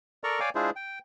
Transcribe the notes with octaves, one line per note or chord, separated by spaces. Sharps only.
A4 A#4 D5 A#5 C#6
C#5 D5 F5 G5 G#5 D6
G#3 D4 E4 F4 G#4 C5
G5